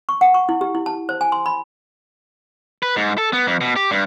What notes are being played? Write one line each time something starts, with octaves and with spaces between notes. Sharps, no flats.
C#6
F#5
C#6
E4
G4
E4
A5
C5
G#5
C6
B5
B4
G#2
A4
B3
F2
B2
G4
G2